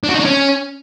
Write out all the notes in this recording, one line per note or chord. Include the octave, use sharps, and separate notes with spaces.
D4
F#4
D#4
D4
C#4